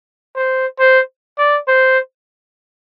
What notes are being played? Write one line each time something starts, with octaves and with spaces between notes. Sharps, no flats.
C5
C5
D5
C5